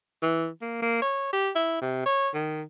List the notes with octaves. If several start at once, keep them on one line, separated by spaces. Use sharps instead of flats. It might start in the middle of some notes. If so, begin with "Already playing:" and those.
E3
A#3
A#3
C#5
G4
E4
C3
C#5
D#3